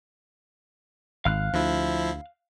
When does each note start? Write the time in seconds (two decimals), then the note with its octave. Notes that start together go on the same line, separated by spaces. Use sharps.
1.25 G#1 F5 F6 F#6
1.53 D2 F3 E4